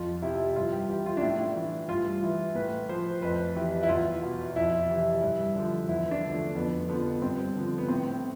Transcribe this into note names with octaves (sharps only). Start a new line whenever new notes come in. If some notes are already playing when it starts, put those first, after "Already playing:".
Already playing: F2 F4
C3 F3 E4
G2 F4
G4
E3 G4
F4
D4
A2 E4
E3
G2 F4
E3
A2 B4
F3 C5
F2 B4
E3 G4
E4
E2 F4
B2
F2 E4
C3 E3
G2
D3 F3
E2 E4
D4
D3 F3
A3
F2 B3
D3 F3 B3
B3
G2 C4
D3 F3
B3
A2 C4